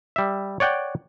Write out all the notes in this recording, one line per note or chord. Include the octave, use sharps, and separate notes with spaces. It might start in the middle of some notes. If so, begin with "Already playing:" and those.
G3 E5
C#5 D5 F#5 G5